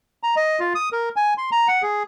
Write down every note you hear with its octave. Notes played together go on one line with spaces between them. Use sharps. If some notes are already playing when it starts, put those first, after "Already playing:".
A#5
D#5
F4
D#6
A#4
G#5
C6
A#5
F#5
G#4